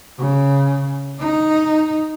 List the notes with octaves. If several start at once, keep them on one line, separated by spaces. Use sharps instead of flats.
C#3
D#4